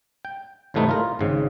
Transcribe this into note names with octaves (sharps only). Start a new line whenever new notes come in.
G5
G#1 A2 C3 A3 D#4 B4
F4 A#4
G#1 G#2 C#3